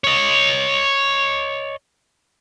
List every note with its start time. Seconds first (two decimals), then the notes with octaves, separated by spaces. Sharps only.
0.04 C#5 D#5